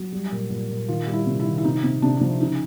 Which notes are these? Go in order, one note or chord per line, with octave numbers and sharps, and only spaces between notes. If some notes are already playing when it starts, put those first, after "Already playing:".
Already playing: F#3 F#4
G3
A#2
A#2
A#2
D#3 F4
G3
E4
C3
E4
D#3
E4
C3 D#4
C3
C3 D4
F3 D4
C#3 D#4